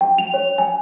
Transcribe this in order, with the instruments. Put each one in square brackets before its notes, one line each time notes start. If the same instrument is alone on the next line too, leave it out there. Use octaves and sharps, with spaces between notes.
[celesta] G5
F7
C#5
G#5